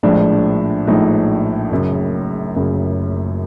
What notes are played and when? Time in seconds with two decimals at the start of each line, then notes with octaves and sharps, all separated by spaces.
0.03 A#1 A2 F3 G#3 D4
0.87 A#1 A2 F3 G#3 D#4
1.71 F#1 F#2 C#3
2.55 F#1 F#2 C#3